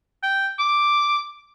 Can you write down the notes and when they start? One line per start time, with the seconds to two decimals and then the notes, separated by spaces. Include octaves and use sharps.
0.23 G5
0.59 D6